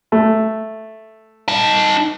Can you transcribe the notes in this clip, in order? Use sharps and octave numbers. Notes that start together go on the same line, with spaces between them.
A3
D#4 A5